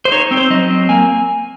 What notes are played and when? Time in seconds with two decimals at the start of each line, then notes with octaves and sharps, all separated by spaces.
0.05 C5
0.12 D#4 C#5
0.31 C4
0.37 C5
0.50 F#3 D#5
0.70 C4
0.89 A#3 G#5